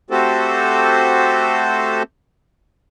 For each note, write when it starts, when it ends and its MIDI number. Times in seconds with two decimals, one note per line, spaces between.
0.10 2.03 57
0.10 2.03 60
0.10 2.03 66
0.10 2.03 67
0.10 2.03 69
0.10 2.03 72